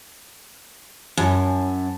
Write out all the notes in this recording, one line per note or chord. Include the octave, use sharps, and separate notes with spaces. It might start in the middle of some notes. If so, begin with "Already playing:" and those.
F#2 E4 G#5 A5